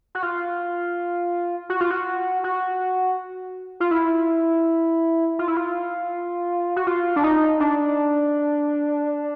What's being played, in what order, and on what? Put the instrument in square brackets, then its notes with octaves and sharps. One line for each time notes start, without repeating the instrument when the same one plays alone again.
[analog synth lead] F#4
F4
F#4
F4
F#4
F#4
F4
E4
F4
E4
F4
F#4
F4
D4
D#4
D4